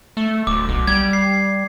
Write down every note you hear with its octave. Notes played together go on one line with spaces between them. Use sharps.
A3
D1 D6
B1
G3 G#6
C7